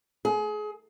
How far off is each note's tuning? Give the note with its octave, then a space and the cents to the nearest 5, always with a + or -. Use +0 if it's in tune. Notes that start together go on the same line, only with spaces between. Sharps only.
G#4 +30